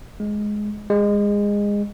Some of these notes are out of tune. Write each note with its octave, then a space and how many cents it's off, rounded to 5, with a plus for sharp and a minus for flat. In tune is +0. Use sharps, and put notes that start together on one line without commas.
G#3 +10
G#3 -20